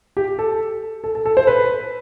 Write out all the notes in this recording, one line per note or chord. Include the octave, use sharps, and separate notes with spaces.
G4
A4
A4
A4
A4
C5
B4